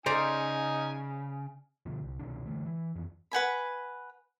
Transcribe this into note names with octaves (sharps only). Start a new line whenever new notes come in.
C#3 D#4 C5 D5 G#5 A#5
B2 D3 F3
C2
C2 B2 D#3 D4
D3 E3 A3
E3
F2 E3
B4 F#5 G#5 B5